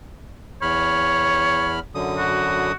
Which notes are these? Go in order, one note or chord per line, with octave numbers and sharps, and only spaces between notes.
E2 C#5 B5 F6
F#2 D3 D#6
F#4